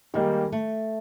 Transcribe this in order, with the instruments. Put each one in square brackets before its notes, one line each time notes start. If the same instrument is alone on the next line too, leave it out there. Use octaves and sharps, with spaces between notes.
[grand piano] D#3 G3 A#3 D#4 [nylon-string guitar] G#3
[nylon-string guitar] A3